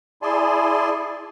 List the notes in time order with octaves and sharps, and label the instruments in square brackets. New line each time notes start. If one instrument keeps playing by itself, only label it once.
[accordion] E4 G#4 D5 G#5 A5 C6